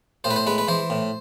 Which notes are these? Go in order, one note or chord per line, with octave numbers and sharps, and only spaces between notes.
A2 C5
B4
C5
G#3 B4
B4
E3 C5
A2